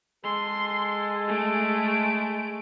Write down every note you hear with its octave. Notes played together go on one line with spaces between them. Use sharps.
G#3 A4 C6
A3 D7